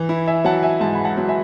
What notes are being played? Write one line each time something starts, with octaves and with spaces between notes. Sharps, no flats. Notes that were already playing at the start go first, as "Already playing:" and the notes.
Already playing: E3
E4
E5 G#5
F#3 F#5 A5
E5 G#5
G#2 F#5 A5
B5
F#5 A5
F#3
E5 G#5